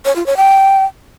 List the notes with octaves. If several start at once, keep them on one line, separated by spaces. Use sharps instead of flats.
C#5
F4
C#5
G5